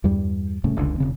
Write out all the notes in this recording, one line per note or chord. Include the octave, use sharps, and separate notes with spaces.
E2 G2 G3
D1 C2 A2 C#3
F1 C#2 D3
E1 C#3 C4